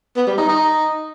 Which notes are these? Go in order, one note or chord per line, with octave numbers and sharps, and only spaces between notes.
B3
G3
D#4
D#4